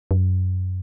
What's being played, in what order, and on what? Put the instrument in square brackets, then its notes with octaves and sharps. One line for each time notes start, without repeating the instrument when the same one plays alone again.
[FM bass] F#2